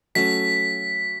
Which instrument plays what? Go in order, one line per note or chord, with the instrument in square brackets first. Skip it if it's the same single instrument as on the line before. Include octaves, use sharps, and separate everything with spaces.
[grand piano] F#3 A3 C#4 F#4 A4 [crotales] B6